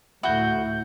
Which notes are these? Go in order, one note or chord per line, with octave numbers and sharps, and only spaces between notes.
D2 A2 E4 F#4 G6